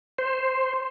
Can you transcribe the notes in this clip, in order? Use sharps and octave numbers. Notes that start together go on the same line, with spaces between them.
C5